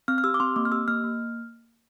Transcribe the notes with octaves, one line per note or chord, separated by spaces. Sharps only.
C4 F6
F6
G4 E6
D6
C4 C6
A#3 D6
F6
G4 E6
A#3 F6
A#3